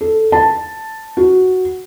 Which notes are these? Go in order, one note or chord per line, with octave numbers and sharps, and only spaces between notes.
A4
A5
F#4